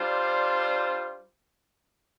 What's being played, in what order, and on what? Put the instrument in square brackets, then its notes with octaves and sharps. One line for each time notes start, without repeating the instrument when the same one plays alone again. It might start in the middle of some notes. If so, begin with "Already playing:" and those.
Already playing: [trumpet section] G3 D4 F4 C5